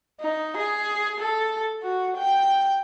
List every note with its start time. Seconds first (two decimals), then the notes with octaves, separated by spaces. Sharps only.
0.21 D#4
0.57 G#4
1.20 A4
1.83 F#4
2.17 G5